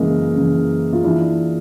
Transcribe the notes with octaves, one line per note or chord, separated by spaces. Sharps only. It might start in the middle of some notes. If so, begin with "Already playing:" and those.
Already playing: F#2 C#3 E3 G#3 A#3
F#2 C#3 E3
F4
E3 D4 E4